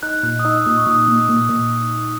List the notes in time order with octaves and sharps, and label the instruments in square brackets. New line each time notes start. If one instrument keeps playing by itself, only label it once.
[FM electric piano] D#4 [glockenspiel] F#6
[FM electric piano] A#2 [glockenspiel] F#6
[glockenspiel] D#6
[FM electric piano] D#4 [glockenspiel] E6
[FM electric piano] A#2 [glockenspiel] D#6
[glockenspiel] C#6
[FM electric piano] A#2 [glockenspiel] D#6
[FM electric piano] A#2
A#2
A#2